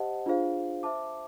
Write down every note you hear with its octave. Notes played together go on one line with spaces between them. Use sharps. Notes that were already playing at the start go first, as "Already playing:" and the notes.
Already playing: G4 C5 D#5 F#5 A5
D4 F4 G#4 C5 F5
C5 E5 A5 D6